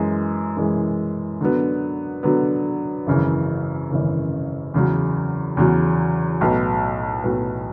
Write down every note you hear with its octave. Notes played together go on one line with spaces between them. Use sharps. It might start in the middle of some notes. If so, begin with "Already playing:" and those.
Already playing: F#2 E3 G#3
F#2 E3 G#3
D3 F#3 B3
D3 F#3 B3
G#1 F#2 C#3 E3
G#1 F#2 C#3 E3
E2 C#3 F#3
E2 C#3 F#3
B1 A2 F#3 B3
B1 A2 F#3 B3